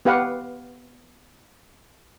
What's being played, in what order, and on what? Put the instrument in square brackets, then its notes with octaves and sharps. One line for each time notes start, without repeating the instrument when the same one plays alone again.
[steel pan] B3 G4 B4 F5 F#5